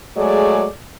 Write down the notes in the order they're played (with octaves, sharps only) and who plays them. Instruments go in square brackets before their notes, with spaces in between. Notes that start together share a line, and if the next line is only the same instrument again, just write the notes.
[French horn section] F#3 G#3 A3 G#4 D5